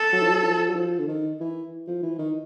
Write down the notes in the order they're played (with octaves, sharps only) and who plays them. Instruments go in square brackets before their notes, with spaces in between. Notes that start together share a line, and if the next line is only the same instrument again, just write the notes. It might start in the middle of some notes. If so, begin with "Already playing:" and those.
Already playing: [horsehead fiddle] A4
[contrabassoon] F#3
F3
F#3
F3
F#3
F3
D3
D#3
E3
F3
E3
D#3